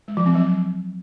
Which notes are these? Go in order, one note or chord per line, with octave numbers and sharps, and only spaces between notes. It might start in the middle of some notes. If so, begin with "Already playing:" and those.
G#3
F3
C4
F#3